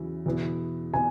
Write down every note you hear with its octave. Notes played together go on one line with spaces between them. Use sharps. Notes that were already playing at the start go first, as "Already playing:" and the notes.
Already playing: E2 C#3 F#3 E4
E2 B2 B3 E4
B2 B3 G#5